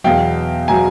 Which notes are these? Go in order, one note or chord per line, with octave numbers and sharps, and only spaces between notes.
E2 B2 F#3 F5 G5
B2 F#3 G#5 A#5